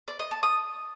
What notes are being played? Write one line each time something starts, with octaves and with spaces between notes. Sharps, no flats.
D5
D#5
A5
D#6